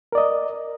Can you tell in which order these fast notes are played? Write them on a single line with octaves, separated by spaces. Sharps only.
A#4 D5 D#5